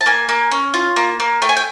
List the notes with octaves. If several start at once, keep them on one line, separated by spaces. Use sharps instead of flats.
A5
A#3 G#5
A#3
C#4
F4
A#3
A#3
A3 G5
G#5
G5